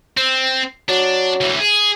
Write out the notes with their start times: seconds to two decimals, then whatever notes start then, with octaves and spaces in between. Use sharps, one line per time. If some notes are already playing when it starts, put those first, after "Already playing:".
0.17 C4
0.89 F#3 D4
1.41 D2 E3
1.60 G#4